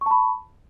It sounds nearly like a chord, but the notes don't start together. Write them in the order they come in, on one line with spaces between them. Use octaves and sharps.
C#6 A5 B5